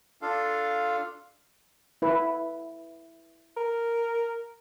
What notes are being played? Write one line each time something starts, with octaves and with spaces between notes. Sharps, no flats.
D4 F4 A4 F5
E4 B4
A#4